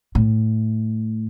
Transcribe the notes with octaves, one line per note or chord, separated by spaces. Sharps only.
A2